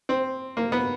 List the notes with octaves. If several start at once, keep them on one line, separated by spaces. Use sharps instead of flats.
C4
A#3
B3